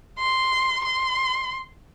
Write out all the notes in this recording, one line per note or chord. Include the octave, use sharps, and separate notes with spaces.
C6
C6